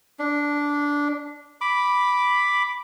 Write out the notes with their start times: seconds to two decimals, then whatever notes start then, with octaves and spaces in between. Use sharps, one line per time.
0.19 D4
1.61 B5 D6